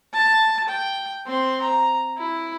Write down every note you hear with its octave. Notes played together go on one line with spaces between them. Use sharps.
A5
G5
C4 C6
A#5
E4